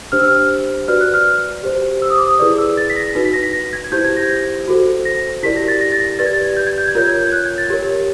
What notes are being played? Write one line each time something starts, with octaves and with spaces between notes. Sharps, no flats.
D4 G4 C5 F6
E6
F6
F#4 B4 D5 F6
F#6
F6
G4 C5
E6
D#6
D6
D#6
E4 G#4 B4 D5 D#6
E6
A6
B6
A#6
D#4 F#4 B4
B6
A#6
B6
A#6
G#6
G#6
E4 G4 C5 G6
G#6
A#6
F#4 A4 C5
A#6
E4 G4 A#4 D5 B6
A#6
A6
A#6
A6
A#6
G4 B4 D5 A6
G#6
A6
G6
G#6
G6
G#6
F4 A#4 C#5 G6
G#6
G6
F#6
G#6
A6
G4 A#4 C#5